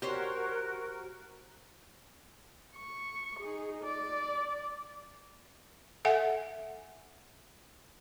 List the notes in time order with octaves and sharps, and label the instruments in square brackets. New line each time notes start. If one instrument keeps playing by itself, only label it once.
[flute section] F#4 A#4 [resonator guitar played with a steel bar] G4 C5 C#5
[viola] C#6
D#4 G#4
D5
[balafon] A4 E5 F#5 G#5